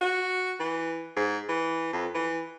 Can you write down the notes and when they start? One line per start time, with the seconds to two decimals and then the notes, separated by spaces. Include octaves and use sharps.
0.01 F#4
0.60 E3
1.16 G#2
1.49 E3
1.93 F2
2.14 E3